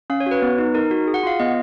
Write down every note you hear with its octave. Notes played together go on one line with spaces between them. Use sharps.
C#4 F5
C#5
F#4 B4
B3
D#4
D#4 A#4
F#4
G#4
F#5
F4 F5
B3 D#5